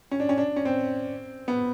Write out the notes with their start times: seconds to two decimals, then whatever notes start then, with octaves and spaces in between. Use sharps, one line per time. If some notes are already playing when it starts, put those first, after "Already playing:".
0.11 C#4
0.20 D4
0.29 C#4
0.38 D4
0.56 C#4
0.65 C4
1.48 B3